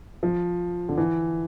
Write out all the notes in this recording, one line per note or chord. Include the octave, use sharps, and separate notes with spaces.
F3
D3
E3